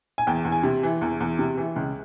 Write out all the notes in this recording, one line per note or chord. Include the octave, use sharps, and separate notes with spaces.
G#5
E2 G5
E2
G#5
C3
E3
E2
E2
C3
E3
C#2